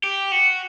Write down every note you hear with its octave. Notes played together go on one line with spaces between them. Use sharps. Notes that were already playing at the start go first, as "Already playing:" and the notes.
G4
F#4